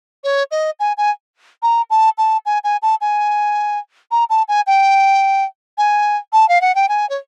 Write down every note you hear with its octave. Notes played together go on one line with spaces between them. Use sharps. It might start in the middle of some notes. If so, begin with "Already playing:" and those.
C#5
D#5
G#5
G#5
A#5
A5
A5
G#5
G#5
A5
G#5
A#5
A5
G#5
G5
G#5
A5
F5
F#5
G5
G#5
C#5